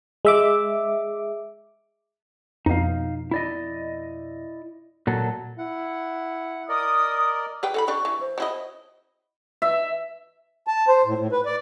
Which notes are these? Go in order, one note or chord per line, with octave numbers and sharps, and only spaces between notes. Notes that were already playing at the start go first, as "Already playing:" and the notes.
G#3 E5 D6
F2 B2 D#4 F5
E4 D5 D#5
A#2 F#3 A4
E4 F#5
A#4 D5 D#5 D#6
G4 B4 G5
E3 A4 F#5 B5
D4 G4 C#5 C#6
E3
C5
F#3 E4 D#5
E5
A5
C5
A2
A2
B4
D5